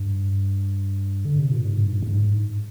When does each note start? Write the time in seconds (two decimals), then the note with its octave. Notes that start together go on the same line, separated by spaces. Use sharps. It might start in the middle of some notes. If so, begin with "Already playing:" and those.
Already playing: G2
1.25 D3
1.39 C3
1.51 A#2
1.65 G#2
1.77 G2
2.03 G#2